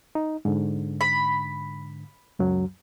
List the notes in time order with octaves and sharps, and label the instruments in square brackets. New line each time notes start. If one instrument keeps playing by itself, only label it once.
[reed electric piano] D#4
G#2 D3
[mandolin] B5
[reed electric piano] C#2 F#2 F#3